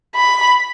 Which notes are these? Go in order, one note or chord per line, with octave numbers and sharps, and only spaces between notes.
B5